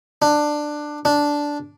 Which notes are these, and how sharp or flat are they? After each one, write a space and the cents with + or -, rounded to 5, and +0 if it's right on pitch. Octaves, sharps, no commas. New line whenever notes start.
D4 +15
D4 -5